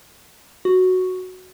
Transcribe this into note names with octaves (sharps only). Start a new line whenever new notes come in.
F#4